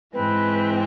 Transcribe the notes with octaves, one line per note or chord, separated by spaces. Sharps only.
G#2 E3 G#3 C4 B4